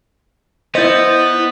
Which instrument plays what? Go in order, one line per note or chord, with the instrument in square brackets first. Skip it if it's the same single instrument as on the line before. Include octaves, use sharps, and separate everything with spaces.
[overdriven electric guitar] B3 [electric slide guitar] E4 D#5 [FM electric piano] C5 G6 A6